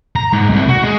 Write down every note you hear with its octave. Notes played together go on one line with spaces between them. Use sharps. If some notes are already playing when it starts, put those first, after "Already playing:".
A#5
G#2
C2
F#4
G#3